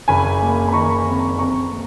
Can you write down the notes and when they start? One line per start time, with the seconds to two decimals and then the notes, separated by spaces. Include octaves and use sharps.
0.08 F#1 G#5 B5
0.41 A#3
0.68 B5
0.73 D#3 A#5 C#6
1.06 F2
1.38 F2 A#5 C#6
1.71 A#3